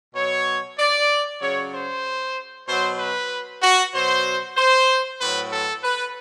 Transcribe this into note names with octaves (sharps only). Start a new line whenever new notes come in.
B2 F#3 C#5
D5
C#3 F#3 C#5
C5
B2 F#3 C5
B4
F#4
B2 F#3 C5
C5
A2 B4
F#3
A4
B4